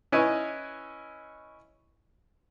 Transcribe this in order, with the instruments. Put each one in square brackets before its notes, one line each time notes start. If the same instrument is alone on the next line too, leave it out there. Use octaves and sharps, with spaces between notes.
[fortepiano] C#4 E4 B4 C#5 D#5 G#5